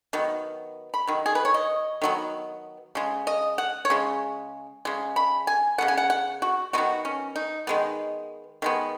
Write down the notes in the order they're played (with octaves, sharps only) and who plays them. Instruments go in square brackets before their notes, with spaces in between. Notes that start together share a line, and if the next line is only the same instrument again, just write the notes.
[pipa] D#3 F#3 B3
B5
D#3 F#3
G#4
B4
C#5
D#5
D#3 F#3 B3
C#3 G#3
D#5
F#5
C#5
C#3 G#3
C#3 G#3
B5
G#5
C#3 G#3 B3 F#5
G#5
F#5
F#5
F#4
G#3 B3 F#4
D#3
C#4
D#4
D#3 G#3 B3
D#3 G#3 B3